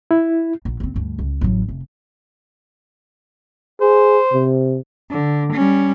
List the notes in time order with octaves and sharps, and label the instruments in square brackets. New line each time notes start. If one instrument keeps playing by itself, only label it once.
[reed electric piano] E4
[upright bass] A#1
F#1 C4
D2 G2
C#2
A1 F#3
F1
[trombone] G#4 [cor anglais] C5
[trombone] C3
[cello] D3
G3 C#4